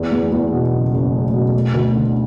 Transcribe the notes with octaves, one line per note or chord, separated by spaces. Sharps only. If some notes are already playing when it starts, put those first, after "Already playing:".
Already playing: E2
E2
E2
B2
F#1
F#1
A3
B2
A3
D2
D3